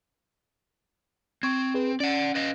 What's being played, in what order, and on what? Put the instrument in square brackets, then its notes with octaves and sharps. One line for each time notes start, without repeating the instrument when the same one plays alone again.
[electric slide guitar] C4 [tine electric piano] C#6 G#6
[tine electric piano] G#4 B4
[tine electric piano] C#4 [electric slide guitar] D5 F#5
[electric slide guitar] B4 D#5 F5